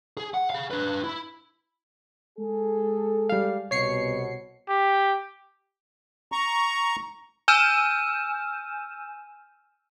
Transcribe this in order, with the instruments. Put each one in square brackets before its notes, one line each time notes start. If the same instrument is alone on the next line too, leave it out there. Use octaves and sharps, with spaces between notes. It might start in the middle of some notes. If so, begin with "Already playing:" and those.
[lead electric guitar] G#4
F#5
G#4 F5
D4 B4
E4
[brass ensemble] G#3 G#4 A4
[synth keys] G3 F5
[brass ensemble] C2 B2 [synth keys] C#5 C7 C#7
[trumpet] G4
[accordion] A#5 C#6
[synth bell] G#5 E6 F6 G6 D#7 E7